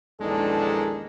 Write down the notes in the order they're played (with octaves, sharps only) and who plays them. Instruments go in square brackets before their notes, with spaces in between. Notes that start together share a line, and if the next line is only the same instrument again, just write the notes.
[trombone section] A#1 E2 D#3 G#3 D4 A4